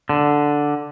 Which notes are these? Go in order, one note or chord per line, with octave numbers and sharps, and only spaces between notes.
D3